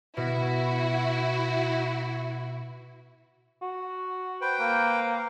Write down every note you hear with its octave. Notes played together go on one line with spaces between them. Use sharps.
B2 E4 F#4
F#4
B4 C5 G5
A#3